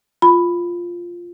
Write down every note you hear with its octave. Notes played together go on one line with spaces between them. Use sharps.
F4 B5